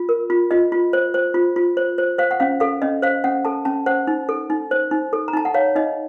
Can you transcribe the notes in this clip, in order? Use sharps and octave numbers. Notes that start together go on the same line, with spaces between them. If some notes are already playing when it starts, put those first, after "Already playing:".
Already playing: F4
A#4
F4
F4 D#5
F4
C5
C5
F4
F4
C5
C5
C5 F5
F#5
C#4 F5
A4 F5
C#4 D#5
C5 F5
C#4 F#5
A4 A5
C#4 A5
C5 F#5
D#4
A4
D#4
C5
D#4
A4
A#5
D#4 A5
F#5
C#5 F5
D#4 D#5